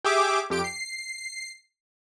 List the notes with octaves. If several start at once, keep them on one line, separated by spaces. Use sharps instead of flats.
G4 G#4 E5 D6
F2 G4 D7
C7